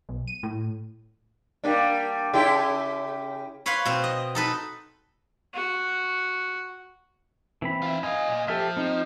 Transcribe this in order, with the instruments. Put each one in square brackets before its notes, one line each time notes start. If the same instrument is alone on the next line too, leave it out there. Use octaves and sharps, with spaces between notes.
[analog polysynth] B1
D#7
A2
[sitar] G3 A#3 D4
C#3 E4 G4
[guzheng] B4 C#5 F5 F#5 B5 C6
B2 C4
D#5
D#4 A4 B4
[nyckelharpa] F#4
[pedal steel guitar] E3 C4 B5
[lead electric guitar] F4 E5
[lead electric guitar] F#2 F5 [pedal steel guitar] D#5 G#5
[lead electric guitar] A#2
[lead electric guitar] F3 [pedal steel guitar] G4 A4 E5
[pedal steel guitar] C4 D#4